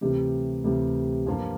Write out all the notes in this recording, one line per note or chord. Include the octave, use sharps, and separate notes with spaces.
D2 C3 E3 G3
D2 C3 E3 G3
G2 F3 A#3 F4